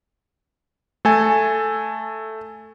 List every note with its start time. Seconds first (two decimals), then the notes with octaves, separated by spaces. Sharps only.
1.05 A3 A4 G#5